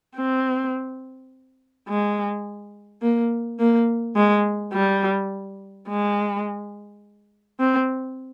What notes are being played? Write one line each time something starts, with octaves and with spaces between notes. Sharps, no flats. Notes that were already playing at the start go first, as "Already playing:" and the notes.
C4
G#3
A#3
A#3
G#3
G3
G#3
C4